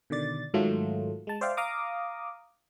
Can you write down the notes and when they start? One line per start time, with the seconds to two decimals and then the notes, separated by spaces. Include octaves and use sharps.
0.10 B2 D3 D#3 D5 A6
0.54 G#2 D#3 F#3 A3 F4
1.27 G#3 A5
1.41 C5 D5 E5 F5 G5
1.57 F5 A#5 D6 D#6